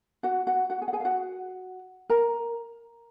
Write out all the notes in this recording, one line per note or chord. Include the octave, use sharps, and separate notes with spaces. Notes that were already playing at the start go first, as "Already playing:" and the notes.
F#4 F#5
F#4 F#5
F#4 F#5
G#4 G#5
F#5
G#4 G#5
F5
F#4 F#5
A#4 A#5